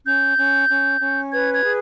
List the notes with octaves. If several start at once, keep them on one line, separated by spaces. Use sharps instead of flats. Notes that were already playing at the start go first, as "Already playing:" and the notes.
C#4 G6
C#4
C#4
C#4
B4 G#6
G#6
G#4